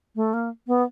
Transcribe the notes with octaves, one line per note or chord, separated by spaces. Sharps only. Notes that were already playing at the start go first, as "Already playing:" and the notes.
A3
A#3
B3